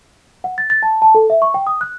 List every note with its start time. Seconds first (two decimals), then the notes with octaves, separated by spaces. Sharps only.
0.44 F#5
0.58 A6
0.70 A6
0.83 A5
1.02 A5
1.15 A4
1.30 E5
1.42 C#6
1.54 G5
1.67 D#6
1.81 F#6